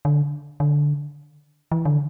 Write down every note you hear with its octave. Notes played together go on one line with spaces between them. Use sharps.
D3
D3
E3
D3